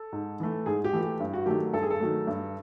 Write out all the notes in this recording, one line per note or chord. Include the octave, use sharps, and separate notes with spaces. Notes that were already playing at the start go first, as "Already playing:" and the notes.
Already playing: A4
G#2
E3 A3
G#2 G#4
G4
E3 A3
G4
G2
F#4
D#3 F#3 A3 G4
G2 A4
G#4
A4
D#3 F#3 A3
G2